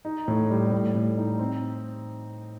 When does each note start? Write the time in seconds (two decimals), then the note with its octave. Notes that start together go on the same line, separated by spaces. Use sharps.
0.05 D#4
0.28 A2
0.50 G3
0.72 A2
0.95 A2
1.17 D#4
1.39 C4